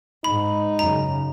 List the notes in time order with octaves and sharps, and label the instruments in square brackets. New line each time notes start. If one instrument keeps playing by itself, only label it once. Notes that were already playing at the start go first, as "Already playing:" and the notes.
[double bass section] G#2 [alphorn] D#4 [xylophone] B5
[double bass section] F#2 C#3 [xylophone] A#5